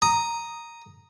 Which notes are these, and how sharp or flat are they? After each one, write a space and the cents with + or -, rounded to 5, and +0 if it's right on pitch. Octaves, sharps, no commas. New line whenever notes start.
A#5 +0 D#6 +0